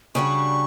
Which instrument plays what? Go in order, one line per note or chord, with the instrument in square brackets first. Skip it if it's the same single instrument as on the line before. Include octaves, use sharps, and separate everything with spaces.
[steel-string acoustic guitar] C#3 G3 D4 F#4 [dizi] C#6